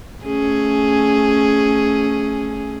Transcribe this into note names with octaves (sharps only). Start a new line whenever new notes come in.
A3 C#4 G#4